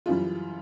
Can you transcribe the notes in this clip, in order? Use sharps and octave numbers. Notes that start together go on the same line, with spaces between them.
F#2 C#3 E3 G3 F4